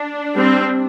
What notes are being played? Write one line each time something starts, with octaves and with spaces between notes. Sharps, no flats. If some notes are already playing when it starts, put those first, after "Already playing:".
Already playing: D4
G3 C4